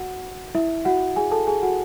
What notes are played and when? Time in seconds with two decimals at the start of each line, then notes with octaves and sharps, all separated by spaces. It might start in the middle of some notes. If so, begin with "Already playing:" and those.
Already playing: F#4 F#5
0.55 E4 E5
0.85 F#4 F#5
1.16 G#4 G#5
1.31 A4 A5
1.47 G#4 G#5
1.63 F#4 F#5